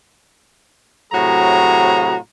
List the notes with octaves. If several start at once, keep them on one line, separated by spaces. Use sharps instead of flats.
A2 C3 F#3 F#4 G#4 A#5